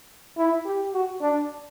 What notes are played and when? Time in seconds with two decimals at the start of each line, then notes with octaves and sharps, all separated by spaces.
0.37 E4
0.65 G4
0.93 F#4
1.21 D4